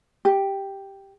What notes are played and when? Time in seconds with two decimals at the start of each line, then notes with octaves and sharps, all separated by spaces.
0.25 G4